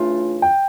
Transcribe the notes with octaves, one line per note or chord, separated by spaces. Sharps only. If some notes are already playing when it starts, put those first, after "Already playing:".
Already playing: C#3 E3 A3 D4 F4
G5